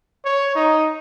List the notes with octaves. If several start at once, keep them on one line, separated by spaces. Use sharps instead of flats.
C#5
D#4